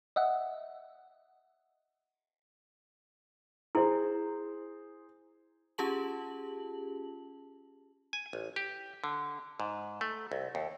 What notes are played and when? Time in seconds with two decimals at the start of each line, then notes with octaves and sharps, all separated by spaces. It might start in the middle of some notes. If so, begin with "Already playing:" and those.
0.16 D#5 E5 F#5
3.75 E4 G#4 C5
5.78 C#4 F4 G4 G#4 A5 F#7
8.13 G#5
8.33 A1
8.56 G4
9.04 D3
9.60 G#2
10.01 A3
10.32 C2
10.55 D#2